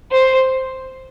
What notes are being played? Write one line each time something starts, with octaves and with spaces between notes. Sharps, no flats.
C5